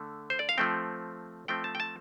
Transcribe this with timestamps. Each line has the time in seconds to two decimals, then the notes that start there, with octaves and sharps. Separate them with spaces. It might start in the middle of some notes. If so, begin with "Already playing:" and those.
Already playing: D3 A3
0.30 C5
0.39 D5
0.49 F5
0.58 F3 A3 C4 G5
1.48 F3 A3 C4 G5
1.64 A5
1.75 G5
1.80 A5